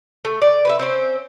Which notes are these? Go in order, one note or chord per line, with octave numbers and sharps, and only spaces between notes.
A3
D5
B4 C5 E5
C4 C#4 C5